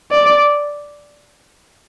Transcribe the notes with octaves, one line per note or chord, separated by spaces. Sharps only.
D5